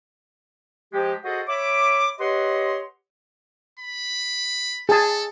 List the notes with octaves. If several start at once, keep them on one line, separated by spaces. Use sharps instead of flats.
F3 G#3 G4
F#4 G#4 A4 C5 D#5 F#5
C#5 E5 B5 D6
G4 B4 C#5 D#5 F#5 C6
B5
G#4 A4 A5